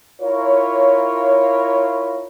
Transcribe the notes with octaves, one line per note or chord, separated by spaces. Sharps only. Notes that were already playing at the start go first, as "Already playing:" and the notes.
E4 F4 A#4 C#5